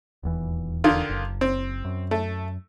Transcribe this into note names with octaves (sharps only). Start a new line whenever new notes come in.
D#1 E2 E3
D3 D#3 F4
F#1
C4
F#2
A3